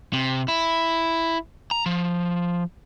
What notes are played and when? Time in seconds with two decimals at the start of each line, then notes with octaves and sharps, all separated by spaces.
0.13 C3
0.48 E4
1.71 A#5
1.86 F3